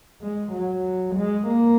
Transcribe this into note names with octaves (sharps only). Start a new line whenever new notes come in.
G#3
F#3
G#3
A#3